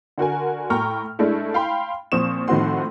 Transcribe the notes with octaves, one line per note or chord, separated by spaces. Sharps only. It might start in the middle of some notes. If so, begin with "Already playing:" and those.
D3 F#4 A#4 G#5
A2 G5 A#5 C#6 F6
G#3 A3 D4 E4
F5 G5 B5 C6
A#2 F3 C4 C#6 D#6 E7
A2 D#3 F3 C4 F#4 C6